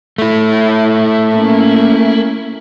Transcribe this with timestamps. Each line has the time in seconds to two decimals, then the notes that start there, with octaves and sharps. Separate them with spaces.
0.18 A3 E4
1.35 A#3 C#4